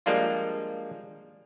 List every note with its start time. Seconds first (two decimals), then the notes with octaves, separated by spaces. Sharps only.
0.06 F3 G3 G#3 A#3 D4 F4